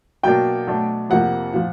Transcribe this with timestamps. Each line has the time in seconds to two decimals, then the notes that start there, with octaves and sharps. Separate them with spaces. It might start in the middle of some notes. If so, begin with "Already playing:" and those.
0.23 B2 F#3 A#3 D4 G5
0.67 B2 F#3 A3 D4
1.10 F2 C3 F3 A#3 F#5
1.54 A#2 F3